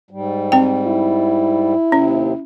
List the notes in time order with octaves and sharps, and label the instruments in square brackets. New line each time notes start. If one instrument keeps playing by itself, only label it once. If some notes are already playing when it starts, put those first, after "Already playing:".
[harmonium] G#2 G3
[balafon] C4 G5
[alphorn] E4
[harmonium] D#2 C3 [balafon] C#4